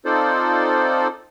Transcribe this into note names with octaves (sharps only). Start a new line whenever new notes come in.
C4 D#4 F4 A4 C5 D5